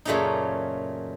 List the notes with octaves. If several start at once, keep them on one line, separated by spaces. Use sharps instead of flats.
F#2 A#2 C#3 A3 C#4 D#4